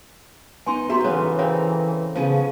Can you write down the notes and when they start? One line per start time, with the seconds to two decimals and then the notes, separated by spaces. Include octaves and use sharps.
0.66 B3 D#4 G#5 C6
0.89 B3 F#4 G4 E5 A#5 C6
1.04 C#3 E3 B3 C#4 A4
1.39 C#3 C4 A#4
2.16 C#3 F3 B3 C#4 G#4